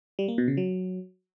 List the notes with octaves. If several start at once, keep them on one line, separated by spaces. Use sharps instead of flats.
G3
A#3
B2
C#3
F#3